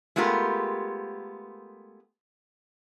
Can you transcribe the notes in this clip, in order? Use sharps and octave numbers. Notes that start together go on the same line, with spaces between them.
G#3 A3 B3 F4 G4 A#4